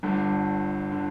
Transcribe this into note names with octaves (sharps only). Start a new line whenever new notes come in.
G1 G2 D3
D3